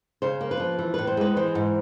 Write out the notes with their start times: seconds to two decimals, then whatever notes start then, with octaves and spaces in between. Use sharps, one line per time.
0.22 C#3 C5
0.41 A#3
0.51 B4
0.60 F3
0.79 E3
0.94 A2 B4
1.07 C5
1.17 G#3 B4
1.36 E3 C5
1.55 G#2